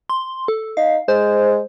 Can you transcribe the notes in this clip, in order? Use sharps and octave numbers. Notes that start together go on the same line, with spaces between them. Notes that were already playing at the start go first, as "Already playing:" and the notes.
C6
A4
D#4 F5
G#3 C5